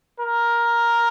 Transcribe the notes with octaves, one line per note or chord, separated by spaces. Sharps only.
A#4